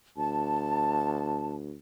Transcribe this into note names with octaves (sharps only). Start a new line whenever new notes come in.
D2 A5